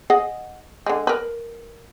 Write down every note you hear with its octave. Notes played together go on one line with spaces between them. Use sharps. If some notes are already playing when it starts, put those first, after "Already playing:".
G#4 D#5 F#5
D3 G#3
A#4 B4